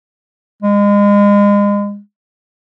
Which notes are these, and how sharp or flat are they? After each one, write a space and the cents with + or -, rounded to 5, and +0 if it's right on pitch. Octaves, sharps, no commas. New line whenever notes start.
G#3 -35